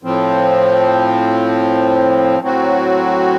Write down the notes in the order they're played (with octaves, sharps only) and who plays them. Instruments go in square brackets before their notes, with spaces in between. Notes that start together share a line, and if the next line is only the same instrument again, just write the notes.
[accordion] A2 F3 C4
A2 F#3 C4 F#4